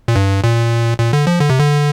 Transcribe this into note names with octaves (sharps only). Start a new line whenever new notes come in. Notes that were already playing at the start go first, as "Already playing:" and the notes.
A#2
G2
A#2
A#2
D3
F3
D3
C3
D3